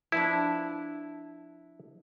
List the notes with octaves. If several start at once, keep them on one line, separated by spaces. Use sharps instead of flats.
F3 B3 D4 E4